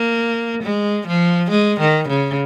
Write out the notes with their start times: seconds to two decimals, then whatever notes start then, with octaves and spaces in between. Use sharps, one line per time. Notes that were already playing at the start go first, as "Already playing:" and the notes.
Already playing: A#3
0.63 G#3
1.07 F3
1.51 G#3
1.80 D#3
2.08 C#3